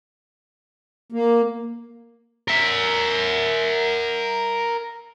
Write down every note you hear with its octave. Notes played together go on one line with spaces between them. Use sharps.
A#3
A#4 E5